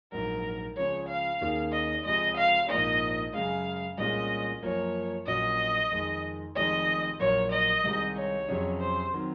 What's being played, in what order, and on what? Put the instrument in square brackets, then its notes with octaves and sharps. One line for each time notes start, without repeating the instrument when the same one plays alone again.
[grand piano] A#1 G#2 F#3 [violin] A#4
[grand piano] C#2 C#3 F3 [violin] C#5
[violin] F5
[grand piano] D#2 D#3 A#3 C#4 G#4
[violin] D#5
[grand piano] C#2 C3 F3 G#3 [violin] D#5
[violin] F5
[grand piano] A#1 G#2 F3 A#3 [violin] D#5
[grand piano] F#2 C#3 G#3 [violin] F5
[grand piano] C2 A#2 G#3 C#4 [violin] D#5
[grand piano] F#2 F3 A#3 [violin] C#5
[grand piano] A#1 A#2 F#3 C#4 F#4 [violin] D#5
[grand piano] F2 D#3 G#3
[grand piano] F1 F2 D#3 G#3 C4 [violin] D#5
[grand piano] A#1 A#2 F#3 A#3 [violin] C#5
[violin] D#5
[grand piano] C2 C3 D#3 G#3 D#4
[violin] C#5
[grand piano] F2 C3 F#3 C#4 G#4
[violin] C5
[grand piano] D#3 F#3 C4